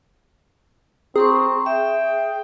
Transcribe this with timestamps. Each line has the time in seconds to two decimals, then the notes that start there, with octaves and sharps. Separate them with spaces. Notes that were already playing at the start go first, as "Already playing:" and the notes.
1.16 C4 G#4 A#5 C6 C#6
1.66 E5 G5